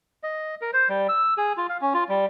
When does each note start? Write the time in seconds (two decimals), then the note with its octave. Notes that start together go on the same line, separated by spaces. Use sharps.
0.23 D#5
0.61 A#4
0.73 C5
0.89 G3
1.09 E6
1.38 G#4
1.57 F4
1.69 F5
1.81 C#4
1.94 F4
2.09 G3